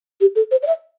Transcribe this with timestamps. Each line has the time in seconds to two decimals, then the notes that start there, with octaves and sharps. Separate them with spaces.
0.21 G4
0.36 A4
0.51 C5
0.63 D5
0.67 E5